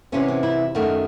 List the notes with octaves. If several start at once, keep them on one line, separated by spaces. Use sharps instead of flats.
E2 C3 E3 C#4
C#4
E4
F#2 D#3 A3 F#4